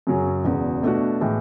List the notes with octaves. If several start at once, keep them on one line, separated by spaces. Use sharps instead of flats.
F#2 C#3 F#3 C#4 G#4
E1 E2 C#3
B2 A3 D4 F#4
A2 E3 G#3